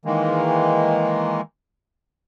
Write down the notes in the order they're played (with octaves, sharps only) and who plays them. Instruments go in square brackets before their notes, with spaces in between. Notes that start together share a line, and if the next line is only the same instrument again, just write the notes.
[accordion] D#3 E3 G#3 A#3